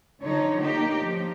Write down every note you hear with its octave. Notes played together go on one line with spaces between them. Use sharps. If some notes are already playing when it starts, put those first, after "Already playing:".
D3 F3 D#4 C#5
A#3 D#4 G4
F3